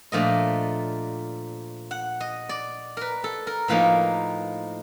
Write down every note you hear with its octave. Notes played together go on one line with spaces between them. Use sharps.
A#2 F3 A3 D4 D#5
F#5
D#5
D5
A#4 B4
A4
A#4
A2 F3 A#3 D#4 B4